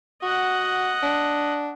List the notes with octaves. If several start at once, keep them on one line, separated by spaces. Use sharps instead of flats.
F#4 D#5 F#5
D4